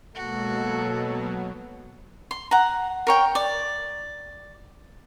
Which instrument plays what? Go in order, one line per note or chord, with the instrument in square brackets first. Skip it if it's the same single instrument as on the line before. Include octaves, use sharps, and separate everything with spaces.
[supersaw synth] B2 F#3 [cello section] G#3 A#3 [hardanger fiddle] F#4 [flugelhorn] A4
[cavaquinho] C6
F#5 A#5
A#4 C#5 G5
D5